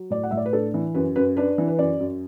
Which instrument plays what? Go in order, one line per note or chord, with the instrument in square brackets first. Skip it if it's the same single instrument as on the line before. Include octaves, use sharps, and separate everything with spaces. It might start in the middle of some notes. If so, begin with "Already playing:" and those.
Already playing: [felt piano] F#3
A2 D5
F#5
A2 E5
D5
B4
D4 A4
E3
F#2 B4
F#2 B4
D4 B4
E3
B4
F#2 D5
F#2